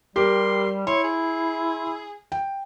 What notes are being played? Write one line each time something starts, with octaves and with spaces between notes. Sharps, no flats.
G3 G4 A#4 C6
E4 C#5 C6
G#4
G5